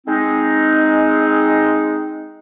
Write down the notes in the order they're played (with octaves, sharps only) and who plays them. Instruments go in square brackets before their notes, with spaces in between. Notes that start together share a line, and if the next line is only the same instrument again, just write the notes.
[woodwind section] G#3 C4 D#4